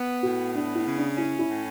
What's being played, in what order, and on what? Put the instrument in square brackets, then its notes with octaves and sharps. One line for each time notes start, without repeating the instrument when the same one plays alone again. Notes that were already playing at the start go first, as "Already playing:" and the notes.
Already playing: [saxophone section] B3
[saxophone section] A2 [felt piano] F#4
[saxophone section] B3 [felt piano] D4
[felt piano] E4
[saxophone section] C#3
[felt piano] D4
[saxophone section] C#4 [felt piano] E4
[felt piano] E4
[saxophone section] A2